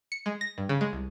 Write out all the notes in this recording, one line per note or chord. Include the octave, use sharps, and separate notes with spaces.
C#7
G#3
A#6
G2
C#3
G#3
C2